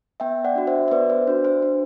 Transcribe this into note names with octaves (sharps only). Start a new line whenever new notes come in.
B3 E5 G5
D5 F#5
D4 F#4
C5 E5
E5
B3 B4 D5
C5
D4 F#4 C5
C5
D4